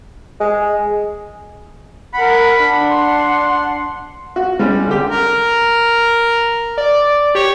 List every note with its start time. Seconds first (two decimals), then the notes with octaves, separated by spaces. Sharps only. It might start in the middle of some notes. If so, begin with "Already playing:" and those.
0.40 G#3
2.14 A#4 F#5 B5
2.59 D4 F#5
2.91 C6
4.36 F#4
4.59 G3 G#3 C#4
4.88 D3 G4
5.11 A#4
6.78 D5
7.35 G4 C#5